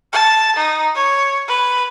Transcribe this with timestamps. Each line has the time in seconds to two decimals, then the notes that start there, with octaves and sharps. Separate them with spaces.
0.13 A5
0.56 D#4
0.95 C#5
1.48 B4